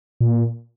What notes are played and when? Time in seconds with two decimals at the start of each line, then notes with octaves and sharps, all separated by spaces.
0.21 A#2